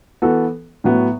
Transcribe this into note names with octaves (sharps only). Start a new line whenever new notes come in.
E3 B3 F#4 A4
A2 F#3 B3